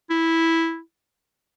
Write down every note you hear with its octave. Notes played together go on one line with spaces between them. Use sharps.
E4